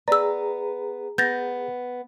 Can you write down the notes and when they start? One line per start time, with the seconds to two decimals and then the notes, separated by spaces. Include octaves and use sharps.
0.08 B3 G#4 B4 D5 A#5 E6
1.18 B3 G6 A6 A#6